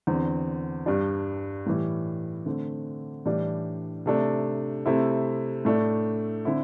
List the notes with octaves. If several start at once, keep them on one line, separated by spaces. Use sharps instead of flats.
E2 D3 C4
G2 G3 D4
A2 E3 G3
D3 A3 C4
A2 E3 G3 D4
C3 A3 D4
C3 A3 C4 E4
A2 A3 D4
D3 C4 E4